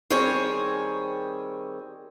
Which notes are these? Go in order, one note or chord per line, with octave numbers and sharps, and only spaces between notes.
D#3 G3 C4 G#4 C#5